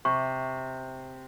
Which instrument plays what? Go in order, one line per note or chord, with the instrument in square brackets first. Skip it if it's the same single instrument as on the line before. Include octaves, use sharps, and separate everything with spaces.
[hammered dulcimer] C3 [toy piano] C#6